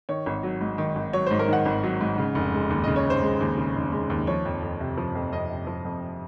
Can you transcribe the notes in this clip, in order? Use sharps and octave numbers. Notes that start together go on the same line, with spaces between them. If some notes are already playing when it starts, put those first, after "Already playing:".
D#3 C#5
G#1
F#3
G#2
D#3
G#1
F#3 C#5
G#2 C5
A#4
D#3 F#5
G#1
F#3
G#2
C#3
F1
G#3
D#2
C#3 D#5
C#5
F1
C5
G#3
D#2
C#3
F1
G#3
D#2
F3 C#5
F2
F2
C3
F3
F2
F2 D#5
C3
F3
F2